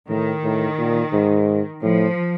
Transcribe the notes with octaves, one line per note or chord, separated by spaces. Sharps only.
A2 D#3
A2
A#2
G#2
A2 F3